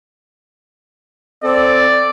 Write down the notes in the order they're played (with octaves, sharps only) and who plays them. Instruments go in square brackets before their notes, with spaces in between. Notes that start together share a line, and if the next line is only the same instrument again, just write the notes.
[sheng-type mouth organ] C4 A4 [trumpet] D5